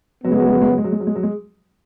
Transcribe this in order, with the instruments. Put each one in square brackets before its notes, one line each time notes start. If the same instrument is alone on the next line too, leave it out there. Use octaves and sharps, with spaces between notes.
[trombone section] F#2 C#3 B3 [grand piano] F#3
[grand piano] G#3
F#3
G#3
F#3
G#3
F#3
G#3
F#3
G#3
F#3
G#3
F#3
G#3